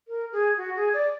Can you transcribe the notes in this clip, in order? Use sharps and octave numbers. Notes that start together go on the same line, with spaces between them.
A#4
G#4
F#4
G#4
D5